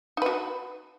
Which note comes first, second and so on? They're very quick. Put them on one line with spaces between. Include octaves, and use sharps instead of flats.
D#4 B4 F#4